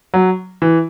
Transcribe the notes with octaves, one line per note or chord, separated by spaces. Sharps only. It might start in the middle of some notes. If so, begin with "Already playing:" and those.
F#3
E3